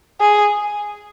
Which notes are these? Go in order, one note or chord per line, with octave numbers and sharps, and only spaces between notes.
G#4